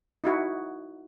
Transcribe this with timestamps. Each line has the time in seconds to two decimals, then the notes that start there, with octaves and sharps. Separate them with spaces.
0.24 D#4 E4 F#4